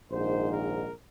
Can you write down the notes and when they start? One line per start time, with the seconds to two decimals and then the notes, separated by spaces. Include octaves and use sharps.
0.11 A#1 G#2 D#3 C5
0.51 A#4